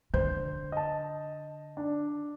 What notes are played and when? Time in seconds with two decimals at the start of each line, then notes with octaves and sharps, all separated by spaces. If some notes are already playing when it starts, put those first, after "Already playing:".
0.14 D3 C5 G6
0.72 D#5 A5
1.77 D4